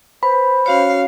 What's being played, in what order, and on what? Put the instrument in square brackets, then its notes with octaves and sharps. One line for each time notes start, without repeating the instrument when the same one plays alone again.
[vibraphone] B4 [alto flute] C5 [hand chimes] B5
[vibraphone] C#4 F#4 C#5 [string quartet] F5